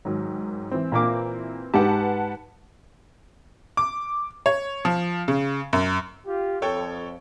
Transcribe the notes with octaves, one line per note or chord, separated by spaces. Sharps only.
G#2 D#3 F#3
E3 C4
A#2 A#3 D6
G#2 G4 B4 F#5 A5
D6
C#5
F3
C#3
F#2
F4 G4
F2 A4 C#5 G5